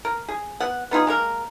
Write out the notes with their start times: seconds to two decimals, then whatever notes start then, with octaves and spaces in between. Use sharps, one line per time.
0.05 A#4
0.28 G#4
0.60 B3 F#5
0.91 B3 D#4 F4 G#4
1.07 G#3 A#3 A#4